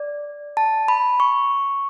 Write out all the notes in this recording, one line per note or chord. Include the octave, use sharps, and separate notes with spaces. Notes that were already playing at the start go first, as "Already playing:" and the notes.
Already playing: D5
A5
B5
C#6